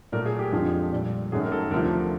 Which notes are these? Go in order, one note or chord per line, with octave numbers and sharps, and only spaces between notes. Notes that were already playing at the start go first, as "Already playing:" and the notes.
A#2 F#3 A3 A#4
G#4
G4
F2 D3 F3 G#3
A#2 G3
F#2 D#3 F#3 A3 G#4
A#4
A4
D2 C3 F3 A3 A#4